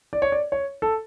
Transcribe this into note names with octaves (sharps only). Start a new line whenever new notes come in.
D5
C#5
D5
C#5
A4